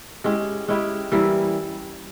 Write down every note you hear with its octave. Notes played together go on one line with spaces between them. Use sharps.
G#3 C#4 E4 G4
G#3 C#4 E4 G4
E3 G3 A#3 E4